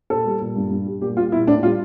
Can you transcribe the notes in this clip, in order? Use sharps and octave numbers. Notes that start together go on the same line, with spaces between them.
A#2 A4
G3
A#2
G2
G2
G3
A#2 G4
G3 F4
A#2 E4
A2 D4
G3 F4